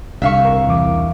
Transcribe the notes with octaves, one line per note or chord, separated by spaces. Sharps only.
C2 D3 E5 F5 C#6
A#4
E2 E3 D6